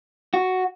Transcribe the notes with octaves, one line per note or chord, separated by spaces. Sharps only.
F#4